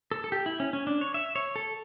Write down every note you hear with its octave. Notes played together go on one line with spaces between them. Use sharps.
A4
A4
G4
E4
C#4
C#4
D4
C#5
E5
C#5
A4